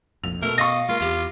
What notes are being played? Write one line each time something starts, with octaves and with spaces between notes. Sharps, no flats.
F1 A#1 F2 F7
B2 A3 B3 A#4
D#5 F5 C#6 A#6
G#3 A#3 F4
E2 G4